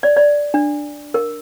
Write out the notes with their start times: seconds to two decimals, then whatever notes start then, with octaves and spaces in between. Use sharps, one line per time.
0.03 D5
0.17 D5
0.54 D4
1.14 A#4